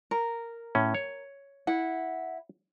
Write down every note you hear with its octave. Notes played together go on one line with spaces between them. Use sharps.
A#4
A2 C#4
C#5
E4 F#5